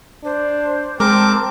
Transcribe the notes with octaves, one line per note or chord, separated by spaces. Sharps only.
D4 C5
G#3 C4 A#4 A5 D6